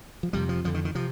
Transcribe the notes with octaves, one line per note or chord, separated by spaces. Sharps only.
F3
F2 C3 G3
F3
F2 D3 F3
D#3
D#3
C3 F3